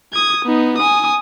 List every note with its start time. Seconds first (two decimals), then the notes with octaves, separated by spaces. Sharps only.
0.13 D#6 G#6
0.45 B3 D#4
0.78 G#5 D#6